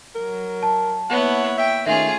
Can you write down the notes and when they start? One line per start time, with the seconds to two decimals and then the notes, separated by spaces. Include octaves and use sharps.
0.15 F#3 A#4
0.63 A5
1.10 A#3 B3 E4 C#5 F#5
1.58 E5 G5
1.86 D#3 A3 C#4 F4 G#4 E5